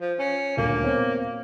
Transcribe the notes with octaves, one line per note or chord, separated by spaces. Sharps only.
F3
C#4
D#1 D2 A#3
B3 C4 C#5